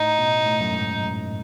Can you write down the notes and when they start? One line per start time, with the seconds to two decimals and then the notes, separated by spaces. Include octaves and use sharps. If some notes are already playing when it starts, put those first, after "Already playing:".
Already playing: A2 D#4
0.18 B2
0.45 A2
0.61 F#2
0.73 G#2
0.99 F#2